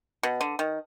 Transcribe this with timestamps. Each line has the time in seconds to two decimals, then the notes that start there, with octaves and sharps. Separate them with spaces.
0.23 B2
0.41 D3
0.59 D#3